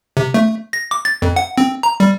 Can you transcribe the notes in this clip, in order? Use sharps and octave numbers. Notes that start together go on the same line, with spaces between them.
C3
A3
A#6
D6
A6
F2
F#5
C4
A#5
G3